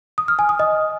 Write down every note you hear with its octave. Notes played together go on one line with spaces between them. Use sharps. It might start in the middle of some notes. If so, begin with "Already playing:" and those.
D#6
F6
G#5
D#6
D#5